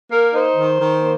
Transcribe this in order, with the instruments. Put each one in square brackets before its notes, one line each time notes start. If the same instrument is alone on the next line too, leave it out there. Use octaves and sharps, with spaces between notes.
[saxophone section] A#3 A#4
D#4 C5
D#3
D#3
A#3